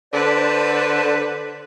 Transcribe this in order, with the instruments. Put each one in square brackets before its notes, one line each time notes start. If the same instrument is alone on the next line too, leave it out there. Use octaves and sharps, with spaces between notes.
[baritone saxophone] D3 [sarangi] B4 [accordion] C5 D5 A5